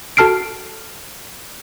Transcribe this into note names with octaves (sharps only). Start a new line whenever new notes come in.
F#4 A4 A5 F6 C7 D7